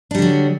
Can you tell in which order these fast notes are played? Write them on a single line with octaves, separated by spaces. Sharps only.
D4 G3 D3 F#3